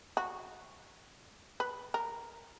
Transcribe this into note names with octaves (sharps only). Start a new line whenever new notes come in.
F#4
B4
A#4